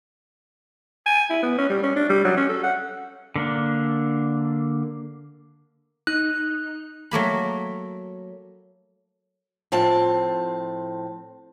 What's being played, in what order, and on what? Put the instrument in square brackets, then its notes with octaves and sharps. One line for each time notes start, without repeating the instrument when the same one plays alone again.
[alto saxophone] G#5
E4
B3
C#4
G3
C#4
D4
G3
F#3
C#4
A4
F#5
[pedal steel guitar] D3 A#3 D4
[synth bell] D#4 [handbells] F#6
[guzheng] F#3 A3 A#3 B5
[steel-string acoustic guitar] A2 F3 C4 A5